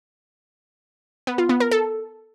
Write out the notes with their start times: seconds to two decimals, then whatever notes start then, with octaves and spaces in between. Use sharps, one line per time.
1.27 B3
1.38 F4
1.49 B3
1.60 A#4
1.71 A4